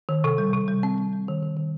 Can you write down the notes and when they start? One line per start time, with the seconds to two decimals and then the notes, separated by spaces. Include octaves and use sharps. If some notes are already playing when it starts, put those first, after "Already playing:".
0.09 D#3
0.24 C3
0.38 G3
0.53 C3
0.68 G3
0.83 C4
0.98 G3
1.13 G3
1.28 D#3
1.43 D#3
1.56 D#3